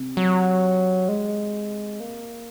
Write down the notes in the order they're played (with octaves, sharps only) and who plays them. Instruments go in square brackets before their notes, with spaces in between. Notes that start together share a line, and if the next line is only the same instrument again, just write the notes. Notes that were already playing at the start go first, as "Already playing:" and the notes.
Already playing: [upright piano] C3
[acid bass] F#3
G#3
A#3